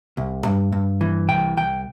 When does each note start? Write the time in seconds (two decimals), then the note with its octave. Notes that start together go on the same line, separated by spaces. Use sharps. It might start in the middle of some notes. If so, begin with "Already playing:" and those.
0.17 C2
0.45 G2
0.72 G2
1.01 E3
1.29 C2 G5
1.57 C2 G5